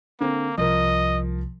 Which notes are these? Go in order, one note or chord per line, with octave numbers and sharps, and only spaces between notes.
D3 A#3 C4
C2 F3 A#4 D#5